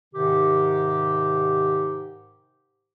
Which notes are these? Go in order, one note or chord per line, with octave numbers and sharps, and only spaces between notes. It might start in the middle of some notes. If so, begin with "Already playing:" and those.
G#2 C3 D#3 G4